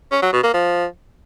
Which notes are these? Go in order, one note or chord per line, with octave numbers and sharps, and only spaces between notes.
C#4
F#3
B2
A#3
F3